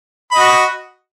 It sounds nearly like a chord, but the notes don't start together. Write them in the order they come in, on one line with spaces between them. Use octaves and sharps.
B5 D#5 F#4